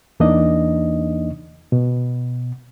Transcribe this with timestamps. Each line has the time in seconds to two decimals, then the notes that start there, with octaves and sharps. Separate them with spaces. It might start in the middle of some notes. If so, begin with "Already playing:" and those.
0.20 E2 E3 A#3 D4 D#4 D#5
1.72 B2